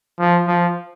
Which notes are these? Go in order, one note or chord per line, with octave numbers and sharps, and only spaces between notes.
F3
F3